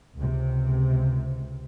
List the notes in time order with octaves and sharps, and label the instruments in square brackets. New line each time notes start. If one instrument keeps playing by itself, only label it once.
[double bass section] C#2 C3